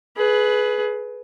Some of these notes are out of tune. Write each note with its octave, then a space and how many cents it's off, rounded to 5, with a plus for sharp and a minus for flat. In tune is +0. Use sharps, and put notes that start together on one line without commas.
G#4 +25 B4 +0